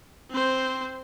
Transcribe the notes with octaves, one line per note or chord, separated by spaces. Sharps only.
C4 C5